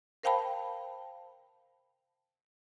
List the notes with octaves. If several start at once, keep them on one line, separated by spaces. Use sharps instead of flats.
A#4 C5 F5 G5 A5 B5